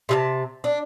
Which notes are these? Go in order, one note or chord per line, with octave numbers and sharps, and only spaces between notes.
C3 G#4 A5
D4